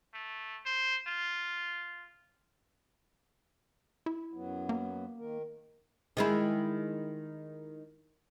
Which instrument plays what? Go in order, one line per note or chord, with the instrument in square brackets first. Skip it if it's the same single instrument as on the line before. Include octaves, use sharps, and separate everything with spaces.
[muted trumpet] A3
C5
F4
[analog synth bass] E4
[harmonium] F#2 F#3 B3
[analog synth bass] A#3
[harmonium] D#3 A#4
[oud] D#3 G#3 E4